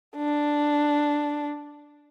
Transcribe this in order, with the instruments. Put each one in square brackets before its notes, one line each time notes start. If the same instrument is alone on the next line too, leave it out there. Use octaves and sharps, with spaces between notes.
[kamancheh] D4